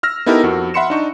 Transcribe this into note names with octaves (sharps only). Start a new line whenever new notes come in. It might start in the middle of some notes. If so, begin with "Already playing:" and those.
E6 F6 A#6
B3 D#4 E4 G4 A4 A#4
F2 F#4
E5 F#5 B5 C6 C#7 E7
D4 D#4 C#6